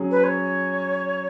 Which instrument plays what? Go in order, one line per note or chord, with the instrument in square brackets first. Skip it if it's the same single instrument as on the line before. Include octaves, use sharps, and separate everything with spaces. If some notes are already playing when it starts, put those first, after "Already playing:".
Already playing: [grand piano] F#3 C#4 G#4
[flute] B4
C#5